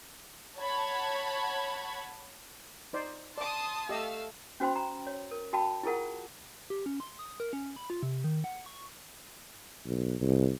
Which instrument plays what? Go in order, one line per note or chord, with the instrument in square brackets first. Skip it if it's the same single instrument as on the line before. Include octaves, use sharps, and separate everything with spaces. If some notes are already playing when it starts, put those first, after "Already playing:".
[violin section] C#5 F#5 A5 B5 G#6
[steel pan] D#4 C5 D5
[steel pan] D5 D6 [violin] A5 [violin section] C6 D#6
[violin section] A3 F5 E6 [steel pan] G4 D#5
[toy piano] C#4 F#4 C5 G5 B5 C6
A#5
C#5
A#4
F#4 G5 A5 B5
E4 F4 G#4 A#4 F#5
[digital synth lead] G4
C#4
C6
D#6
A#4
C#4
B5
F4
C3
D#3
F#5
C#6
[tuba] B1
C2